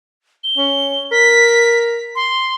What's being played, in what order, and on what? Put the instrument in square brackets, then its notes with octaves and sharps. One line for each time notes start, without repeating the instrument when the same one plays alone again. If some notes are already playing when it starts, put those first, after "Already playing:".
[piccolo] G7
[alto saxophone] C#4
[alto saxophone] A#4 [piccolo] B6
[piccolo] C6